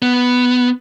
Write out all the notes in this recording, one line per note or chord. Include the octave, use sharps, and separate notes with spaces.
B3